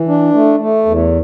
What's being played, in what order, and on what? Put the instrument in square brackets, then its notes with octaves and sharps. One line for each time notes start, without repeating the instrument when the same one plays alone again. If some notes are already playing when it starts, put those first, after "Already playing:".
Already playing: [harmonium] E3
D4
A3
A3
E2